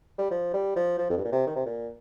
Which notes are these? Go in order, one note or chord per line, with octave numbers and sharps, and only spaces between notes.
G3
F3
G3
F3
F3
F2
G2
A#2
C3
D#3
C3
A#2